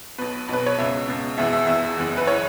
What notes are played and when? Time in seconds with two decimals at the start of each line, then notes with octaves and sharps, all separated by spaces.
0.18 B1 B2 B4
0.49 B1 B2 B4
0.66 C#5
0.78 C#2 B2 E5
1.08 C#2 B2
1.38 E1 E2 E3 E5
1.53 E5
1.67 E1 E2 E3 E5
1.97 F#1 E2 E3
2.17 B4
2.27 E3 C#5